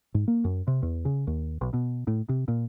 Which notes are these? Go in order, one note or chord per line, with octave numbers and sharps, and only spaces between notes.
G#2
A#3
F#2
C3
E2
C#3
D#2
B1
B2
A2
C3
A#2